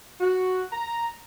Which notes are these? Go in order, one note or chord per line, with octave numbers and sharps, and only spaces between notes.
F#4
A#5